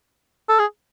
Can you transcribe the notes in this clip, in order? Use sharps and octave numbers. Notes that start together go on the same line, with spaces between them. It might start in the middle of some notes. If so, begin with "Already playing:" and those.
A4
G#4